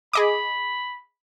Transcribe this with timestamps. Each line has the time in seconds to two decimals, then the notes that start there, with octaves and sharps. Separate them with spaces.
0.13 G#4 D#5 B5 D6